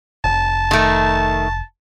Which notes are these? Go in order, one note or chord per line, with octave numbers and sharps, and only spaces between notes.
F1 A5
D#3 A3